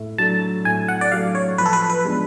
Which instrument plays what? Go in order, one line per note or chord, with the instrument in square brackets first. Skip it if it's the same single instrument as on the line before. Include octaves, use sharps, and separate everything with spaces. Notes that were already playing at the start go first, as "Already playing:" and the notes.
Already playing: [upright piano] A2
[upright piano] F#3 A3 D4 [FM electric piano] A5
[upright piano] A2 [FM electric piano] G#5
[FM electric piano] F#5
D5
[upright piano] F#3 A3 D4 [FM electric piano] F5
[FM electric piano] C#5
[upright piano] F3 [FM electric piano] B4
[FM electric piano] A4
B4
B4
[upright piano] G#3 B3 D4